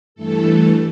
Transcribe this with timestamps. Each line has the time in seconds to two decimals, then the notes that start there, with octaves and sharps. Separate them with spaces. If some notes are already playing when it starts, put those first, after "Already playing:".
0.15 G2 E3 A3 A4